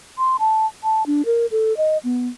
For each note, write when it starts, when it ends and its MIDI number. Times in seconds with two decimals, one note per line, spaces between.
0.18 0.37 84
0.40 0.66 81
0.83 1.05 81
1.06 1.22 62
1.26 1.46 70
1.51 1.76 69
1.77 1.98 75
2.04 2.28 59